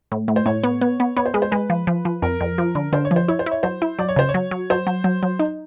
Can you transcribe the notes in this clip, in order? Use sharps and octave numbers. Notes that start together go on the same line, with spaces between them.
A2
A2
C5
A2 C#5
B3
B3
B3
B3 C#5
C5
G#3 B4
C5
G#3 B4
F3
F3
F3
F2 A#4
F2
F3
D3
D3 C5
C#5
F3
C5
E4 C#5
C5
E4
C#5
F#3 C5
E4
F#3 D5
C#5
C#3 C5
C#5
F#3
F#3
F#3 C5
F#3
F#3
F#3
D#4